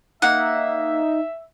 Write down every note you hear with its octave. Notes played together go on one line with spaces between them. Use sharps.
A#3 D#4 E5 F#5